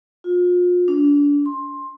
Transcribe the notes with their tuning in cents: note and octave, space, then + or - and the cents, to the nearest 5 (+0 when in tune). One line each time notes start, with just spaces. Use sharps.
F4 +35
D4 -30
C6 +15